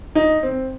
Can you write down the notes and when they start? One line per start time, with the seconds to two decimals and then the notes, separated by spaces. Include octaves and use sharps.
0.15 D#4
0.43 C4